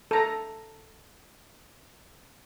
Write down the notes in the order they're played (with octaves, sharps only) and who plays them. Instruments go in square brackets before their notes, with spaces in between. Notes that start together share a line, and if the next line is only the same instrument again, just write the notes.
[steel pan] A4 A#5